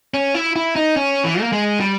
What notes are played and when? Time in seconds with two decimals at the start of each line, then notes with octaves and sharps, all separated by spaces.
0.14 C#4
0.34 E4
0.56 E4
0.76 D#4
0.96 C#4
1.24 E3
1.41 A#3
1.52 G#3
1.80 G3